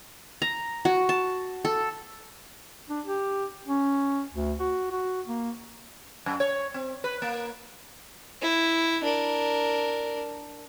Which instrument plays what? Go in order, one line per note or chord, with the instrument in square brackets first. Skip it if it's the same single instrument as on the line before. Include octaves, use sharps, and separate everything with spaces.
[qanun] A#5
F#4
A5
A4
[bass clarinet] D4
G4
C#4
D2
F#4
F#4
A#3
[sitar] F#2
C#5
C4
B4
A#3
[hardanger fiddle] E4
D4 A#4